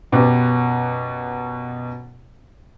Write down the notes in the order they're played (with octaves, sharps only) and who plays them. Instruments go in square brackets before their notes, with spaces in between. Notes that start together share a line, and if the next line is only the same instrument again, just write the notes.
[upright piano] F#2 B2 B3 G4 D6